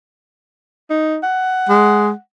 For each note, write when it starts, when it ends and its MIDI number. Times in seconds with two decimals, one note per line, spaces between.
0.90 1.18 63
1.23 2.19 78
1.69 2.10 56